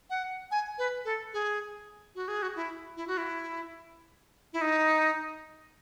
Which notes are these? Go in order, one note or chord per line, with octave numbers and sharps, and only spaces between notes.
F#5
G#5
B4
A4
G#4
F#4
G#4
F#4
E4
E4
F#4
E4
E4
D#4